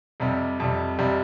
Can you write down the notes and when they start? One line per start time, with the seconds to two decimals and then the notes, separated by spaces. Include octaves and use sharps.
0.20 F2 C3 G3
0.60 F2 C3 G3
0.99 F2 C3 G3